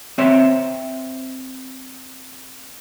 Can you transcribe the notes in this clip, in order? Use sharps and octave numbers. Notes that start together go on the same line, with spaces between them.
C4 C5 C#5 E5 C6